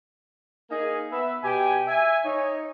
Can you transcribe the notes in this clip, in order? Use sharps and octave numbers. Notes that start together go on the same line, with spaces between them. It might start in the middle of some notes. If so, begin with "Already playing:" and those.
A#3 D#4 G#4 D#5 G#5
B3 B4 E5
B2 G4 G5 G#5
E5 G#5
D#4 C#5